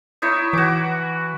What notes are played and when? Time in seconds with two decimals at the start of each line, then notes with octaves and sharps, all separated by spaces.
0.22 D#4 E4 C#5
0.53 E3 F#4 D6